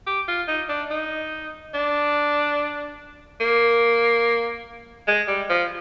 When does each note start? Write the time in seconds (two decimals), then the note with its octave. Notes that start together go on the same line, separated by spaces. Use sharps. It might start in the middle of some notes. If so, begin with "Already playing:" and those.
0.07 G4
0.28 F4
0.48 D#4
0.69 D4
0.90 D#4
1.74 D4
3.40 A#3
5.07 G#3
5.28 G3
5.49 F3